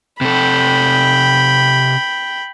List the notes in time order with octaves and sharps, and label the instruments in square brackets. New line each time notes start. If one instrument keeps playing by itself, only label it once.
[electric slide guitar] C3 A4 [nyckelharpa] G5 B5